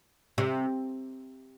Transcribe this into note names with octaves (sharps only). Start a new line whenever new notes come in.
C3